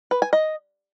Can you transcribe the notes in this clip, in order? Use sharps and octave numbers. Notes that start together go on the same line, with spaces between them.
B4
G#5
D#5